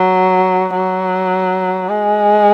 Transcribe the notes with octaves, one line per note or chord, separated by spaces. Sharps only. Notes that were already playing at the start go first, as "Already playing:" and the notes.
Already playing: F#3
F#3
G#3